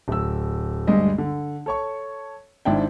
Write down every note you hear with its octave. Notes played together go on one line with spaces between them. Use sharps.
D1 E6
D2 G2 G3 G#3 D#5
D3
A4 C#5 C#6
G#1 G#2 D4 E4 G5